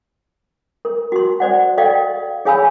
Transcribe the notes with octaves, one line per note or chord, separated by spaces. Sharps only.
A#4
F#4 C6
C5 D5 F#5
A4 D5 D#5 F5 G5
G#4 C#5 F5 G#5 B5 E6